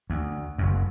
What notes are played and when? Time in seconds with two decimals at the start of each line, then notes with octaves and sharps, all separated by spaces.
0.10 D2
0.58 F#1 F#2